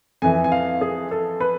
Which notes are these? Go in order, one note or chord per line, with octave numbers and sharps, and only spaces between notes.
F2 E3 G#5
G#5
F5
G#4
A4
B4